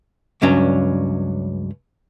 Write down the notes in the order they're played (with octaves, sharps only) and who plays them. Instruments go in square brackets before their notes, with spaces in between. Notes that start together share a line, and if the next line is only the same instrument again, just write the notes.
[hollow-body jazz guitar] C#2 G2 F#3 C#4 D4